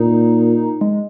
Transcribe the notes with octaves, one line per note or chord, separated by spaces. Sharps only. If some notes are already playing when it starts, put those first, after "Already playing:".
Already playing: A#2 D#4
G#3